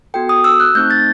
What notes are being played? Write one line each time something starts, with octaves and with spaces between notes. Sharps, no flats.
B3 F#4 A4 G5
D#6
E6
F#6
A3 C4 D#4 G6
A6